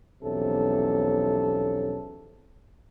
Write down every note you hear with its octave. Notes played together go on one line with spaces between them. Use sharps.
B1 E2 C3 F3 C#4 A4